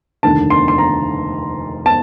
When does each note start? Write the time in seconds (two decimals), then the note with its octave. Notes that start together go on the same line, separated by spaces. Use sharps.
0.23 F1 D#2 D3 A5
0.50 C6
0.68 C6
0.78 A#5
1.86 A5